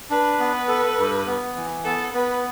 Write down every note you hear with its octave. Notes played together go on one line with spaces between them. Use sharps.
D4 B4
B3
A4
G2
B3
E3
B3 A4
B3 B4